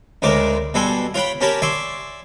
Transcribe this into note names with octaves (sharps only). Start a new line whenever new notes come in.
D2 C#3 G#3 A#4 D5 D6
B2 G3 A4 F#5 G#5 C6
F4 C#5 F#5 G5 B5
C#4 G4 A#4 C#5 A5 B5
D5 E5 G#5 C6 C#6